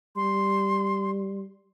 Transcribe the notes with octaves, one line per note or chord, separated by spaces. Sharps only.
G3 C6